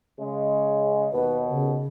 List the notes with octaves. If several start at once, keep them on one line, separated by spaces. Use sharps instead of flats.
C#3 G#3
D#2 B2 B4
C#3